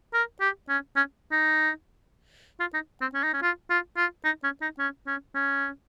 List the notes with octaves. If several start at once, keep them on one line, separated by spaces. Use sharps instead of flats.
A#4
G4
C#4
C#4
D#4
F4
D#4
C4
C#4
D#4
C#4
F4
F4
F4
D#4
C#4
D#4
C#4
C#4
C#4